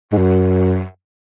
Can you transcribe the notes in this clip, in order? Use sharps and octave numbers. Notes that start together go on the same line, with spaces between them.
G#2
F#2